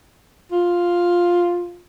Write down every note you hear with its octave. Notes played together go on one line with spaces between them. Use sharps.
F4